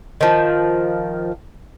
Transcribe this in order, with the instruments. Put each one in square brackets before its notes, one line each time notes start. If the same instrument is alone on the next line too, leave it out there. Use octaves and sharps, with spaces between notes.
[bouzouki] D#3 F3